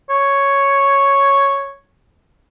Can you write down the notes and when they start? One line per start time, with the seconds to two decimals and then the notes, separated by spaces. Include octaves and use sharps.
0.10 C#5